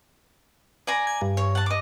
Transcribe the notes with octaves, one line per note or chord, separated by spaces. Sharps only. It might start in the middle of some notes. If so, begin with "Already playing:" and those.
D5 G#5 A#5
G#6
G2
C#5
F#5 A5
D#5 D6